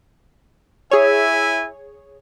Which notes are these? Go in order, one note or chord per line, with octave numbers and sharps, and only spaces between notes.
E4 G#4 C#5 E5 G#5